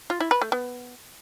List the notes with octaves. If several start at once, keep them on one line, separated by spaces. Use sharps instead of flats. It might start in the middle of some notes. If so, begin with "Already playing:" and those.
F4
E4
B4
A3
B3